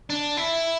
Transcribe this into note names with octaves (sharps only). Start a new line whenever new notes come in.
D4
E4